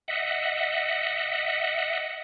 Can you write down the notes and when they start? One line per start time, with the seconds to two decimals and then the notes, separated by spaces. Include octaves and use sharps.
0.08 D#5 E5 F#5